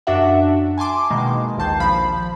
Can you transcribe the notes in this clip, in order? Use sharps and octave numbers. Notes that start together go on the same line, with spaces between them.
F#2 D4 F#4 E5 F#5
G#5 A5 C6 D6
B2 D#3 G#3 A#3
A#1 D#2 D#3 A5 G6 C7
A#1 F3 B5